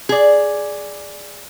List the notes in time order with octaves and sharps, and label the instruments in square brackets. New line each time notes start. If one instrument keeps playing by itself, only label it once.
[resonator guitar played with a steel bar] G#4 D5